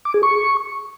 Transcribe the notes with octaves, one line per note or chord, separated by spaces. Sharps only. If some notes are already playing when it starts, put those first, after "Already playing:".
D6
G#4
C#6